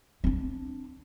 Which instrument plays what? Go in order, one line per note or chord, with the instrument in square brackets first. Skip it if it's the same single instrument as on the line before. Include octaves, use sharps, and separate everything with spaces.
[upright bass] C4 D4